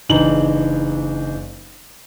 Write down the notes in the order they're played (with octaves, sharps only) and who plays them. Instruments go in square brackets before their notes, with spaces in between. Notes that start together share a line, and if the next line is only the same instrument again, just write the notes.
[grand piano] F#1 E3 D4 D#4 A#5 F#7